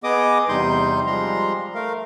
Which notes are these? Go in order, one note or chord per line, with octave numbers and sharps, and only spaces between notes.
B3 G#4 D#5 D6 D#6
E2 C3 G3 D#4 C6 G6
F3 G3 G#3 A#5 C6
A3 A#4 F5